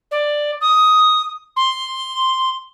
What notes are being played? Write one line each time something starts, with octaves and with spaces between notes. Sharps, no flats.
D5
D#6
C6